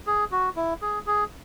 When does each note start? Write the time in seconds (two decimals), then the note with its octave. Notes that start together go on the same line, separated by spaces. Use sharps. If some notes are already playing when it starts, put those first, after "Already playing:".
0.07 G#4
0.32 F#4
0.56 E4
0.82 G#4
1.07 G#4